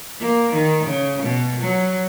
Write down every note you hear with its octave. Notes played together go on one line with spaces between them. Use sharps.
A#3
D#3
C#3
B2
F#3